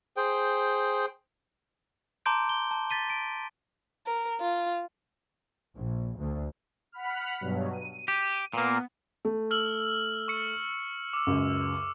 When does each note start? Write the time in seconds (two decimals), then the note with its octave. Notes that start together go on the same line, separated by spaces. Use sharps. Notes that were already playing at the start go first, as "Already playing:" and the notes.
0.17 G#4 C5 G5
2.26 A5 A#5 C6 D6 G6 D7
2.49 G7
2.71 A5
2.90 A6 B6 D#7 G7
3.10 D7
4.06 A#4
4.40 F4
5.74 A#1
6.17 D2
6.92 F#5 B5 F6
7.41 G2 B2 F#3
7.73 D#7
8.08 G4
8.54 A#2 A#3 B3
9.25 A3
9.51 E6 F6 F#7
10.28 C#6 C#7
11.13 D6 E6
11.27 C#2 F#2